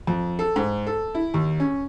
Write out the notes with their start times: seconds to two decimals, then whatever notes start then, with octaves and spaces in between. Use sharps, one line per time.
0.07 F2
0.39 A4
0.56 G#2
0.87 A4
1.15 E4
1.34 D#2
1.60 C#4